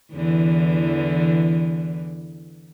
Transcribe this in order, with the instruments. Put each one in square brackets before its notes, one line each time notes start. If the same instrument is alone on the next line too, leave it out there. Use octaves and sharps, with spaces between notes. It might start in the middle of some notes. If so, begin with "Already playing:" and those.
[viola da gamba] E2 D3 E3